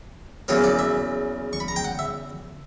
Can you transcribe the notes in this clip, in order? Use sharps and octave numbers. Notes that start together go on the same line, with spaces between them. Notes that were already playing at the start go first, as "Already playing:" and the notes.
E2 C#3 F#3 A#3 C#5
D5
E5
C#6
B5
A#5
G5
F#5
E5